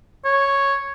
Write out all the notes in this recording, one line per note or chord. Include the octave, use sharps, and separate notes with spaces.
C#5